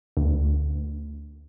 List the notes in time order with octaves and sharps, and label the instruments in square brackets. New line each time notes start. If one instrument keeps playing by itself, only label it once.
[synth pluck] D2